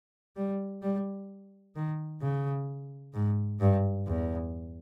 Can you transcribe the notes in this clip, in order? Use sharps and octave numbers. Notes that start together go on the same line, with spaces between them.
G3
G3
D#3
C#3
G#2
G2
E2